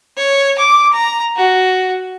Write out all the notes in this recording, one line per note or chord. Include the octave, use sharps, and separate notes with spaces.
C#5
D6
A#5
F#4